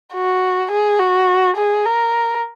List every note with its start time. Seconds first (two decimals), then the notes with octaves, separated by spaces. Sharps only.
0.14 F#4
0.71 G#4
0.99 F#4
1.57 G#4
1.85 A#4